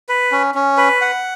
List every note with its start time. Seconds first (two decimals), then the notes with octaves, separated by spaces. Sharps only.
0.09 B4
0.32 C#4
0.55 C#4
0.77 B4
1.01 F#5